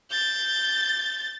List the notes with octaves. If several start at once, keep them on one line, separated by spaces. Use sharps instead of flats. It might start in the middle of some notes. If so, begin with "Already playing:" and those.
G6 A6